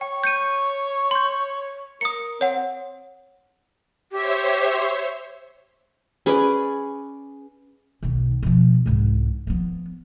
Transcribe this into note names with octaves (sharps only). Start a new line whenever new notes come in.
C#5 G5
G6 C#7 D#7
C6 G6
A#4 D#6 C#7
C4 C#5 F#5
G4 C5 C#5 E5
C#4 G#4 B4 D5
B1 D#3
B2 F3
C2 G#2
F3 B3